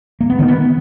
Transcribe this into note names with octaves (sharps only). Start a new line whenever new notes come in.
A#3
B3
D#3
B3